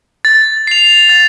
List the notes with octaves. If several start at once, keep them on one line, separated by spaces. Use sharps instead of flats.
A6
C7 F7
A6